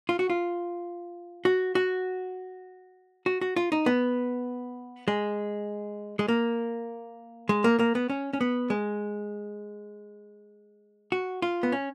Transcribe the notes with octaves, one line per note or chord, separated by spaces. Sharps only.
F4
F#4
F4
F#4
F#4
F#4
F#4
F4
D#4
B3
G#3
G#3
A#3
G#3
A#3
A#3
B3
C#4
C#4
B3
G#3
F#4
F4
B3
C#4